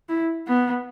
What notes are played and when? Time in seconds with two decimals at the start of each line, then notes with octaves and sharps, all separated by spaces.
0.09 E4
0.47 B3